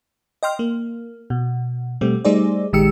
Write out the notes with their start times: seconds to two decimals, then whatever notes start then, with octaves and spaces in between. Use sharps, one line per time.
0.43 D#5 G5 C6 F6
0.59 A#3
1.30 B2
2.01 B2 G3 A3 C4
2.25 G3 A3 D#4 G#4 C5 D5
2.73 A#1 D#3 G#3 G4 E6 C#7